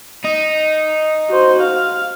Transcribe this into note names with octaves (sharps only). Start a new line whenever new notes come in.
D#4
F#4 C5
F5